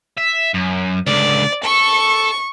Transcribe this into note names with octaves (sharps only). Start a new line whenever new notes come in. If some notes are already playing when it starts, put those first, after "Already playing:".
E5
F#2
C#2 D3 D5
A4 C#6